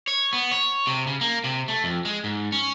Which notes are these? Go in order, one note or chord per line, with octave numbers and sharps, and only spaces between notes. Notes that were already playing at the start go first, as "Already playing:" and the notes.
C#5
B3
C#5
C3
C#3
A#3
C3
A3
F2
G#3
G#2
C#4